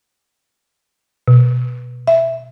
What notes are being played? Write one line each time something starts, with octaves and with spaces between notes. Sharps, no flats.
B2
E5